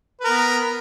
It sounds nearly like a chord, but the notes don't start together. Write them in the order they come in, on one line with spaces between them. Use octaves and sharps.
B4 A#4 B3